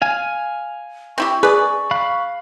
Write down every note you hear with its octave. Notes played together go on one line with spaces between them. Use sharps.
F5 G#5
C4 E4 G4 C#6
G#4 B4 D5
F5 B5 F#6